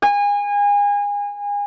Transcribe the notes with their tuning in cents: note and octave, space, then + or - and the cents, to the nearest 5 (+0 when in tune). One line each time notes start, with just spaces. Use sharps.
G#5 -30